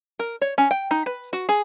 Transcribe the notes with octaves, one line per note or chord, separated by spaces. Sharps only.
A#4
C#5
C#4
G5
D#4
B4
F#4
G#4